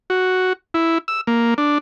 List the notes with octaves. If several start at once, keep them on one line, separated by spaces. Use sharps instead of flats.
F#4
E4
E6
A#3
D4